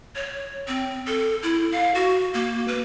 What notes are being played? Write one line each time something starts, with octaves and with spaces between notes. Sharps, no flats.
C#5
C4
A4
E4
F5
F#4
A#3
B4